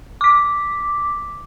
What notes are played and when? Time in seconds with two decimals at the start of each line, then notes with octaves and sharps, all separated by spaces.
0.21 D6 B6